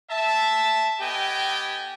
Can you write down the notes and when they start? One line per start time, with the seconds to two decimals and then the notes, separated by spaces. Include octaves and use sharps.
0.11 E5 A5
1.00 B3 G4 A4 D#5 G5 G#5